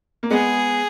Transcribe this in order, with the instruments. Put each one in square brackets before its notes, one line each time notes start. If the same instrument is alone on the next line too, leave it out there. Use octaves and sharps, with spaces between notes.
[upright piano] A#3
[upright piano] G#3 B3 [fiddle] G#4